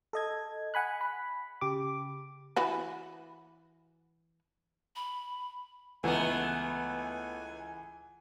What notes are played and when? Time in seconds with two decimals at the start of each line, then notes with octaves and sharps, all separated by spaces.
0.13 A4 D#5 G#6
0.74 F#5 G#5 B5 F#6
1.01 B5
1.61 C#3 G4 D6
2.56 E3 F#4 B4
4.96 B5
6.04 C#2 E3 A3 B3 F#5 G#5